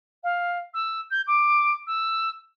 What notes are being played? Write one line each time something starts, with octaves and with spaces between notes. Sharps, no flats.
F5
E6
G6
D6
E6